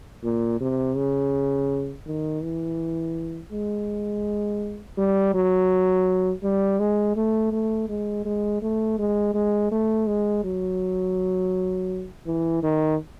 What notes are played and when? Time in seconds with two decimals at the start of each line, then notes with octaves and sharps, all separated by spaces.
0.24 A#2
0.61 C3
0.97 C#3
2.07 D#3
2.43 E3
3.52 G#3
4.98 G3
5.34 F#3
6.43 G3
6.80 G#3
7.16 A3
7.52 A3
7.89 G#3
8.25 G#3
8.62 A3
8.99 G#3
9.34 G#3
9.72 A3
10.07 G#3
10.44 F#3
12.26 E3
12.63 D#3